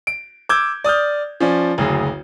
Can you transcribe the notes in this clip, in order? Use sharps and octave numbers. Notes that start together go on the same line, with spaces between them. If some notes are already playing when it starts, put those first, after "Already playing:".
D7
D6 E6 G6 G#6
D5 D#6 F6 G6
F3 C#4 D5
F#1 D2 G#4